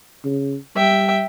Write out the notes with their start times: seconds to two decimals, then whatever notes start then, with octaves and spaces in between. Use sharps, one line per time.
0.25 C#3
0.76 G3 E5 G5